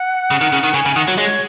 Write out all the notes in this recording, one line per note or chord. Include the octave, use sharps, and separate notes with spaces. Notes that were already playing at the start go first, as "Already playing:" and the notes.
Already playing: F#5
C#3
D#3
C#3
D#3
C#3 G#5
C#3
D#3 F#5
F#3
G#3 C#5